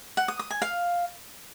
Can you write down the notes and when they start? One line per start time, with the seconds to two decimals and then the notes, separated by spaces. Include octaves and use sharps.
0.17 F#5
0.28 D#6
0.39 D#6
0.50 G#5
0.62 F5